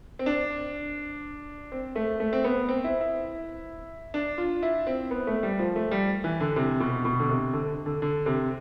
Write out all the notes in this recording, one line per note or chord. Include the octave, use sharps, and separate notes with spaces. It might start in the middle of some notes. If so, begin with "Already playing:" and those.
C4
D4
C4
A3
A3
C4
B3
C4
E4
E4
D4
F4
E4
C4
B3
A3
G3
F3
A3
G3
E3
D3
C3
B2
B2
D3
C3
D3
D3
D3
C3